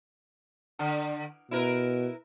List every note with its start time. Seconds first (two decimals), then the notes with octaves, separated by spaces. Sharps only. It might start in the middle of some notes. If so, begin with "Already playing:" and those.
0.79 D3
1.51 B2 E4 A#4 B4